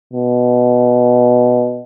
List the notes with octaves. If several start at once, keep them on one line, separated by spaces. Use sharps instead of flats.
B2